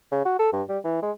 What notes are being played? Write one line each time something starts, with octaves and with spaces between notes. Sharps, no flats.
C#3
F#4
A4
G2
G3
E3
G#3